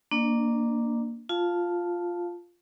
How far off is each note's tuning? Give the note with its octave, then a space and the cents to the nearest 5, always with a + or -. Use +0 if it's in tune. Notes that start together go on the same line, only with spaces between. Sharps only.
A#3 +0 D4 -5 D5 +45
F4 +0 F5 +0 A5 +0